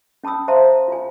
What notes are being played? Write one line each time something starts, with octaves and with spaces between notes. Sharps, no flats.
C#4 A5 B5 D#6 E6
C5 E5 F5 A5 A#5 C6
F4 G#5